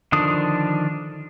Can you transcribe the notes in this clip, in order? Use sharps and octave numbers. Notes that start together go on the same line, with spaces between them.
D3 D#3 F3 D4 D#6